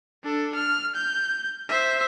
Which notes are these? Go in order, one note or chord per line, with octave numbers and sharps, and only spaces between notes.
D4 A4
F6
G6
C5 E5